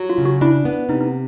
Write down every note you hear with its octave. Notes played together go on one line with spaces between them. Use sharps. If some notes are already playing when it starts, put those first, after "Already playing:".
Already playing: F#3
F4
C#3
F#4
D4 E4
B3
C3 D#4
D#4